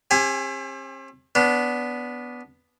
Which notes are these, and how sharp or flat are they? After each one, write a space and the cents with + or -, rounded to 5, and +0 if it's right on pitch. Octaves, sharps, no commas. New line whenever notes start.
C4 +45 G4 +40 G#5 +0
B3 +0 D4 -20